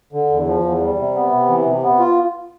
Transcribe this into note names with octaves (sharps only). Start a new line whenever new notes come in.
D3
E2
F3
E2
G3
C3
B3
C3
E3
C3
B3
F4